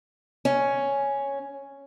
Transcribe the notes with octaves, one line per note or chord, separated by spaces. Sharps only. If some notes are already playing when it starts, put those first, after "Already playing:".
C#4